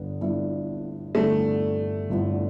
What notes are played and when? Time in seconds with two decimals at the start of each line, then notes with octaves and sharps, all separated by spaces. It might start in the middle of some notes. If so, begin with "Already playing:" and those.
Already playing: G1 G2 D3 B3
0.21 G1 G2 D3 B3 E4
1.15 G1 G2 D3 A3 B3 E4
2.09 G1 G2 D3 B3 E4